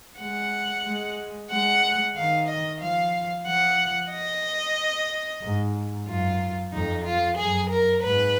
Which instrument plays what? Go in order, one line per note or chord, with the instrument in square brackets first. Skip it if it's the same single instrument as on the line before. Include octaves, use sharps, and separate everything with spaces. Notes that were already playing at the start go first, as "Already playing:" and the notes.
[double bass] G#3 [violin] F#5
[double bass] G#3
[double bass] G#3 [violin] F#5
[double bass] D#3 [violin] F5
[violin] D#5
[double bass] F3 [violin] F5
[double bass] F3 [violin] F#5
[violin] D#5
[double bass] G#2
[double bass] F#2 [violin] F4
[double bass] F2 [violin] D#4
[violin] F4
[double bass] F#2 [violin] G#4
[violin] A#4
[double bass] G#2 [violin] B4